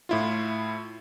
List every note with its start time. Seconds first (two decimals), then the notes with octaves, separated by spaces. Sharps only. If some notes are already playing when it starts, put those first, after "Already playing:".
0.09 A2 E4 F4